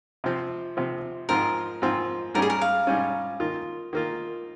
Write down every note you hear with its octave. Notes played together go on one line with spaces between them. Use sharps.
C3 F3 C4
C3 F3 C4
G#2 F3 C4 F4 A#4
G#2 F3 C4 F4
G#2 G3 C#4 A#4
G#4
A#4
F5
G#2 G3 C#4
D#3 A#3 F4
D#3 A#3 F4